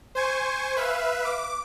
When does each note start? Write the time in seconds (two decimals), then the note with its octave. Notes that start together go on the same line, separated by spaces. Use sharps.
0.15 C5 G#5 C#6
0.76 B4 E5 F5
1.25 D6